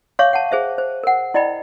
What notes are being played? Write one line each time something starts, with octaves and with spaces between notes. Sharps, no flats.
C#5 E5 F5 C#6 D6
F#5 A5
G#4 C5 E5
C5
A#4 F#5
E4 D5 D#5 G5 B5